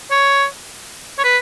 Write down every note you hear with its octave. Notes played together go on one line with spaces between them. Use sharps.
C#5
C#5
B4